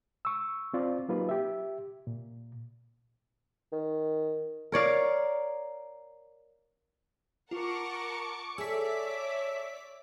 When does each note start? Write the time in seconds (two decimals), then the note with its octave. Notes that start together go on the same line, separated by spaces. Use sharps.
0.25 C#6 E6
0.74 C4 F4 D5
1.09 F#3 A#3 D#4 F4 G4 B4
1.29 G4 E5
2.07 A#2
3.72 D#3
4.72 A#4 C#5 D5 F5
7.51 F4 A#4 F#5 A5 C#6 D6 C#7
8.58 G#4 A4 C#5 D5 E5 D6 E6 B6